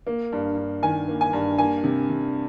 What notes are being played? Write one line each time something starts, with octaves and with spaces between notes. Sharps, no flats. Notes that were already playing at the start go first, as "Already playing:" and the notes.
A#3
G2
G2
D#3 G#5
A#3
G#5
G2
A#3 G#5
C3
C3